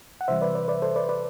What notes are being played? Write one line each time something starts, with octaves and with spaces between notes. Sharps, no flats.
F#5
C3 E3 G3 C5 E5
B4 D5
B4 D5
B4 D5
A4 C5
B4 D5
B4 D5